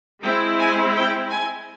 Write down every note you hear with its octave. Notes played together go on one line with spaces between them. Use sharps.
G#3 C4 E4 G5
G#5
G5
G#5